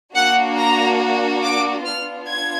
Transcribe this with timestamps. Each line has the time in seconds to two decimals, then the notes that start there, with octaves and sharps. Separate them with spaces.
0.15 A#3 D4 F#4 F#5
0.57 A#5
1.42 D6
1.84 B3 D4 F4 F6
2.27 G#6